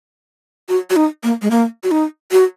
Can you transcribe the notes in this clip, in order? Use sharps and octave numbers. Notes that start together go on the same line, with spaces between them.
F#4
F#4
D#4
A#3
G#3
A#3
F#4
D#4
F#4